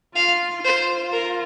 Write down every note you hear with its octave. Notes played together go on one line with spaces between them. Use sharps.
F4 F5
F4 C5
A#4